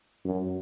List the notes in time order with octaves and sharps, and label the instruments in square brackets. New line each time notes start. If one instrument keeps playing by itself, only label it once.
[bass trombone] F#2